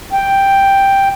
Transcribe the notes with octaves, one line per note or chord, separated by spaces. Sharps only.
G5